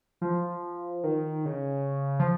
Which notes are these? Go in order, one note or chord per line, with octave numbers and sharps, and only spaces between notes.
F3
D#3
C#3
F3